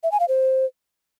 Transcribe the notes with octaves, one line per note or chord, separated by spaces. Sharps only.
E5
G#5
F5
C5